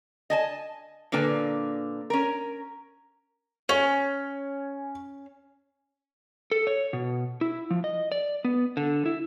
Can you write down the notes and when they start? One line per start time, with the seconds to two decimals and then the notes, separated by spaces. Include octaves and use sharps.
0.30 D#5 G#5 A5
1.12 A#2 D3 A#3 B4 G#5
2.10 C#4 A#4
3.69 C#4 C#5
6.51 A4
6.67 C#5
6.93 B2
7.41 E4
7.71 F3
7.84 D#5
8.12 D5
8.45 B3
8.77 D3
9.06 E4